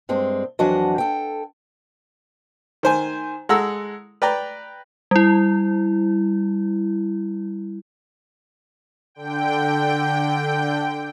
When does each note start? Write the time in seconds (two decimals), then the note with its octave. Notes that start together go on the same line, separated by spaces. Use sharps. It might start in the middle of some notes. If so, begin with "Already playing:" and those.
0.09 G2 G#3 C4
0.59 F2 E3 F#3 D4 F#4 D#5
0.98 A4 G5
2.83 D#3 C5 G#5
3.49 G#3 A4 F#5 A#5 E6
4.22 B4 D5 G5 A#5
5.11 G3 E4
9.15 D3 G5